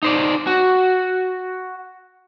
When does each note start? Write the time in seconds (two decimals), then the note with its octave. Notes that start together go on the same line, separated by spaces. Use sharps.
0.03 D#4 C5 D5
0.47 F#4